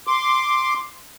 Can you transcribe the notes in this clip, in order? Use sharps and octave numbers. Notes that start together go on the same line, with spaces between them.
C6 D6